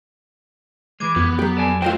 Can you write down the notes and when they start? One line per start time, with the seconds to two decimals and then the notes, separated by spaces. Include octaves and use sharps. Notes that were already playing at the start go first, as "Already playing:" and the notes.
1.00 E3 G#3 D6 G#6
1.16 F2 B3
1.39 F#3 G4
1.57 A4 D5 G#5
1.82 F#3 A3 F4 C5 D#5 G5